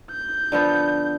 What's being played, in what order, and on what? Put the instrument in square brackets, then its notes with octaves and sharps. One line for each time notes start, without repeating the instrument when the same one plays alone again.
[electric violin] G6
[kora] D3 F3 B3